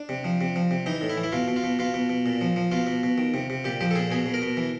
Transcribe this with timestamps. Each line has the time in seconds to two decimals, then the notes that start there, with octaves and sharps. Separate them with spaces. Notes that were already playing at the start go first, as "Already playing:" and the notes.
Already playing: D4
0.09 C3
0.24 F3
0.41 C3
0.56 F3
0.71 C3
0.86 E3 D#4
1.01 A2
1.09 E4
1.17 E3
1.23 E4
1.32 B2 F4
1.48 B2
1.56 F4
1.64 B2
1.79 B2 F4
1.94 B2
2.10 B2
2.26 A#2
2.41 F3
2.56 F3
2.72 B2 F4
2.87 B2
3.03 B2
3.18 D#3
3.34 C3
3.50 C3
3.65 A#2 G4
3.81 F3 G4
3.91 A4
3.95 A#2 G#4
4.11 B2 G#4
4.26 B2
4.34 A#4
4.42 B2
4.57 E3